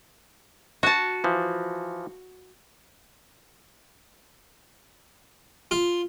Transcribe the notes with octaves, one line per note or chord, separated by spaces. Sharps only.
F#4 A5
E3 F3
F4